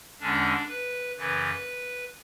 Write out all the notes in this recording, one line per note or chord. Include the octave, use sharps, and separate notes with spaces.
E2 D3 G#3 C#4 D4
B4
F#2 C#3 E3 B4